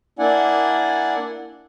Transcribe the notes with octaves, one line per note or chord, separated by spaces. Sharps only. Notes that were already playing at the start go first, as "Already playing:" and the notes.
A#3 D4 E4 D5 F#5 G#5